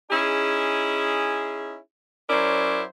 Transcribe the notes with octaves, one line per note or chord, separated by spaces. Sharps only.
C#4 D#4 E4 G#4
F#3 C#4 E4 A#4 C5 D5